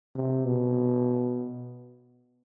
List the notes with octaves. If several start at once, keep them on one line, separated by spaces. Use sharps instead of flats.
C3
B2